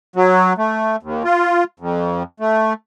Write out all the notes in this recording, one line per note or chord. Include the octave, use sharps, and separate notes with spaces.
F#3
A3
D#2
F4
F2
A3